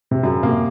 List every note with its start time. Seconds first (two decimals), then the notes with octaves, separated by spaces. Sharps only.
0.11 C3
0.23 F#2 C#3
0.43 C3 A#3